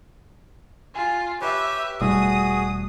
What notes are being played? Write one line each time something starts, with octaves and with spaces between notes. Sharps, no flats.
F4 G#5
G4 B4 C#5 E5
E1 B2 G3 A3 E4 F#4 G#4 D#6